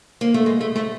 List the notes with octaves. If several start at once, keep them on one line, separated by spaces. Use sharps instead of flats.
A#3
A3
G#3
A3
A3